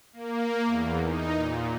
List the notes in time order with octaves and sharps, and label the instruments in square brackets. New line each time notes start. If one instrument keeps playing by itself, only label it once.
[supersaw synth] A#3
E2
D#4
A#2